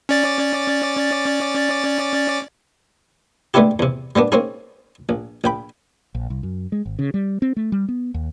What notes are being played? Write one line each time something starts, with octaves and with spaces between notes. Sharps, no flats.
C#4 D5 A6
G#3 A3 B3 D4 E4 G4
E2 C3
G3 A#3 B3 D4
A#3 C4 C#4 D#4 G#4
A#1
A#1 G5 B5
A#1
C2
F#2
G#3
G#1
C#3
G3
C4
A3
G3
B3
D#2